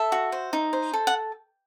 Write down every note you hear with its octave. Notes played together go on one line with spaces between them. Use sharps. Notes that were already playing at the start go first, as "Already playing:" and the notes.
Already playing: A4 E5
F#4
C5
D#4
C5
A4
F#5